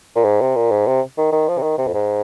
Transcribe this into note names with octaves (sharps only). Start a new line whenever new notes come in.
A#2
G#2
C3
A#2
G#2
C3
D#3
D#3
F3
C3
D#3
C3
F2
G#2